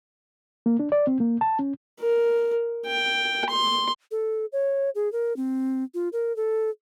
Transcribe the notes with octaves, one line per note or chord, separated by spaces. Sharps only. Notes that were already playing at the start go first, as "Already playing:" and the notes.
A#3
D4
D5
C4
A#3
A5
C#4
A#4
G5
C6
A4
C#5
G#4
A#4
C4
F4
A#4
A4